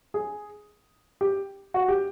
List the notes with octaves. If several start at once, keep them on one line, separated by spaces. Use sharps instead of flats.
G#4
G4
F#4
G4